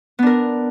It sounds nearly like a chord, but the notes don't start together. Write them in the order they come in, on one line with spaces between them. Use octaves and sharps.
B3 D4 A#4